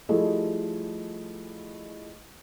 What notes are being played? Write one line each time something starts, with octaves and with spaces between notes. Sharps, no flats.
F3 G3 A3 E4 G#4 D#5